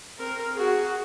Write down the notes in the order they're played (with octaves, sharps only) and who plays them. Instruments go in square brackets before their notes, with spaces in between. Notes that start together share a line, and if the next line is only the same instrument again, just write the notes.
[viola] C4 A#4
F#4 G#4